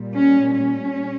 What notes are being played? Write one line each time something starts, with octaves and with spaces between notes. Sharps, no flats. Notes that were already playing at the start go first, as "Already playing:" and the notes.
Already playing: A#2 G3
C#4
C#4